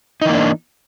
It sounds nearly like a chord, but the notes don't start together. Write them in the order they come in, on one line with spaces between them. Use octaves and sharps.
D#4 E3 A#3 D4